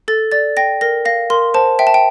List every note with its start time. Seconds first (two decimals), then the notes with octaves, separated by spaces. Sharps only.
0.08 A4 A6
0.32 D5 A6
0.57 G5 A#6
0.81 A#4 A#6
1.05 F5 A#6
1.30 A#4 C6
1.54 C5 A5
1.79 E5 G5
1.87 A5
1.94 G5